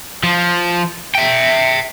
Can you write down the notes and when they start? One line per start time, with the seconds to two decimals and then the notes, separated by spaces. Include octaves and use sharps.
0.24 F3
1.15 E5 G5